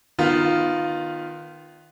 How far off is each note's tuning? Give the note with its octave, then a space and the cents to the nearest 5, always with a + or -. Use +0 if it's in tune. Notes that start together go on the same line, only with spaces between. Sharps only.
D#3 -15 B3 +0 F4 +0